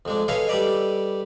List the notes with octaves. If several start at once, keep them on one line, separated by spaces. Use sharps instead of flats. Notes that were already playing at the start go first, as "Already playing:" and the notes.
F2 G#3 D4
G#4 A4 B4 C#5 D#5 F5
G3 A4 B4 D5 D#5